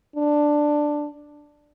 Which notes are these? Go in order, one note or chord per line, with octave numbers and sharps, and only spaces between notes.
D4